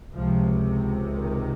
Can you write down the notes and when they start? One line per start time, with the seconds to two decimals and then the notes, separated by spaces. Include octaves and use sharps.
0.14 C#2 C3 F3
1.12 D#3